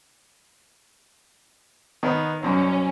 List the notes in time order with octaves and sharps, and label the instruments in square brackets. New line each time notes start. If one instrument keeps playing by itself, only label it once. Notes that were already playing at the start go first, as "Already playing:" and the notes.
[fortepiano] D#3 B3 B4
[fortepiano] C2 F#2 B2 [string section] C#4